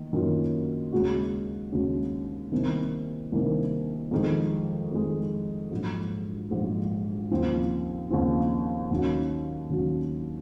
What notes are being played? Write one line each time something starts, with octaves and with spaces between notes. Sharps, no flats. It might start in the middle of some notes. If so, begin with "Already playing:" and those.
Already playing: D#3 A#3
F#2 D#3 A#3 C#4 F4
D#2 C#3 G#3 C#4 F#4
D#2 C#3 G#3 C#4 F#4
C2 C3 D#3 A#3
C2 C3 D#3 A#3
F2 D#3 G#3
F2 D#3 G#3
A#1 G#2 F#3
A#1 G#2 F#3
D#2 C#3 F3 C4
D#2 C#3 F3 C4
D#2 D#3 F#3 C#4 F#4
D#2 D#3 F#3 C#4 F#4